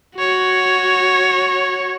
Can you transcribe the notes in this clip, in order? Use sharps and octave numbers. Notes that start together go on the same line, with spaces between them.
F#4 C#5